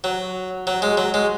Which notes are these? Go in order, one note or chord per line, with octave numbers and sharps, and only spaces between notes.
F#3
F#3
G#3
F#3
G#3